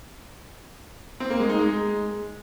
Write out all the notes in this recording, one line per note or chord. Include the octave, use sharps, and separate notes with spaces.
C4
A#3
G#3
D#4
G#3